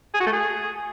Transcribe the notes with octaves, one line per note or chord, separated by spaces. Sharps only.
G#4
F#4
A3
G#4